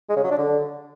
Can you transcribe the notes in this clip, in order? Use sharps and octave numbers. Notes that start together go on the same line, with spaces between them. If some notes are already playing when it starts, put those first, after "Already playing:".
G#3
C#3
F#3
D4
D3